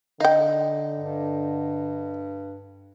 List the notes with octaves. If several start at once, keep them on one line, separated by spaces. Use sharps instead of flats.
D3 D#4 F5 G5
G2